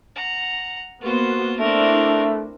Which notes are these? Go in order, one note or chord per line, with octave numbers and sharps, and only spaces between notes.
F#5 A#5
A#3 B3 F4 F#4 C5
A3 C4 D4 E4 A#4